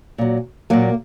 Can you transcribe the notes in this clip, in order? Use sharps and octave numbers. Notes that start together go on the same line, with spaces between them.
A#2 F#3
A#2 F#3 A#3